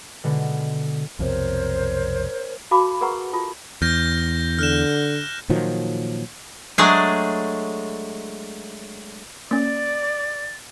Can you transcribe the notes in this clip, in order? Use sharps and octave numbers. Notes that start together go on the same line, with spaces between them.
B2 D3 G#3
B1 F2 C3 A#4 C5 C#5
F#4 A4 F5 A5 B5 D6
G#4 A#4 B4 F#5 A#5 C#6
F4 A4 A5
E2 F6 G6 A#6
D3 F6 F#6 E7
A#2 D#3 F3 F#3
F#3 G#3 A3 D4 G#4 G#5
A#3 C#4 D5 A6